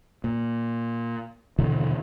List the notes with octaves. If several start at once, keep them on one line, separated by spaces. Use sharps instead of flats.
A#2
D#1 B2 D3 E3